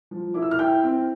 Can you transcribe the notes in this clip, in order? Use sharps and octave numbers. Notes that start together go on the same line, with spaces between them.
F3
E4 D6
E6
F6
E4 G5 G6
C4